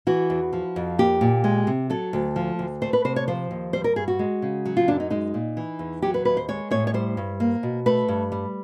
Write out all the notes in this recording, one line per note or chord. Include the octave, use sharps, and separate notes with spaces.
E3 F#4
E2
F3
F2
A#3 G4
A#2
G#3
C3
F#3 A4
D2
F3
D2
A3 C5
B4
C3 C5
C#5
F3 C5
D#2
G3 C5
A#4
G2 G#4
F#4
G#3
C#3
F#3
F4
F#2 D4
D#4
G#3 D#4
A#2
E3
E2
F#3 G4
B4
D#2 B4
C5
G#3 C#5
A2 C#5
C#5
G3 C5
G2
A#3
B2
A3 B4
G2
G3